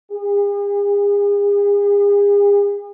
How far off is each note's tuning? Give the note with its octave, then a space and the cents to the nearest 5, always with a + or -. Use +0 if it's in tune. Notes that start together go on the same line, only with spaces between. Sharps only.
G#4 -40